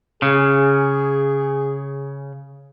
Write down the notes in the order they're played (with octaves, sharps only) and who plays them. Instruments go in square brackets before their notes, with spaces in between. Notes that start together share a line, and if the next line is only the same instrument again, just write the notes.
[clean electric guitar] C#3 [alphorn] G#4